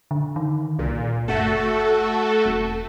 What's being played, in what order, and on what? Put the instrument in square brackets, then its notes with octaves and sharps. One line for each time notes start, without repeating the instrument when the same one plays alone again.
[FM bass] D3
D#3
[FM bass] C2 [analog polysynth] A#2
[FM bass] F#1 [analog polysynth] A3 F#4 A4
[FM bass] E1